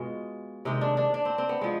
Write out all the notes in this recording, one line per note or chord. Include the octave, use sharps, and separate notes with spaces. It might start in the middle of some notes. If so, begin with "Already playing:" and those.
Already playing: B2 G#3 F4
C3 D#3 G#3 D#4
D4
D4
D4
C4
C4
B3
F3 G#3